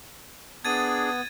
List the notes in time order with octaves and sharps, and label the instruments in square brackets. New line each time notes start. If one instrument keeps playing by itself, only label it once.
[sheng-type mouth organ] B3 [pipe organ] D4 G#4 [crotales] G#6 A6 D#7